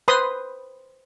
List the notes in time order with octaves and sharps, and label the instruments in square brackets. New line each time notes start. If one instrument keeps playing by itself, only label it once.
[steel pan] B4 C5 B5 C6 D#6